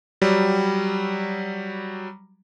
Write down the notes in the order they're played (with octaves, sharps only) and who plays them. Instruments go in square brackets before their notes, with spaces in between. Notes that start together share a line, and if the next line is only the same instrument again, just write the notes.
[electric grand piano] F#3 G3